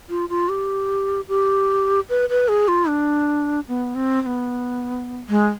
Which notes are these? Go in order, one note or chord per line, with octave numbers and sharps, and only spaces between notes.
F4
F4
G4
G4
B4
B4
G#4
F4
D4
B3
C4
C4
B3
G#3